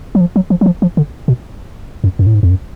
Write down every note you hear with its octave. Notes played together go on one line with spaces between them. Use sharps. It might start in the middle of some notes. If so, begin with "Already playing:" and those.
F#3
F3
F#3
F3
F#3
F3
F3
D3
B2
F#2
F#2
A2
G#2
F2
F#2